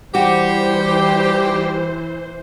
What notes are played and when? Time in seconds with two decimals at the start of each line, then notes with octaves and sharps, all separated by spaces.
0.15 E3 G3 F#4 G4 C5